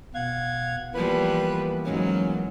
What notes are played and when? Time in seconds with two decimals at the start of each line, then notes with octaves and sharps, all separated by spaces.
0.15 B2 F5 F#5 G#6
0.95 E3 F3 G3 A#3 B3 B4
1.85 G#2 F#3 C#4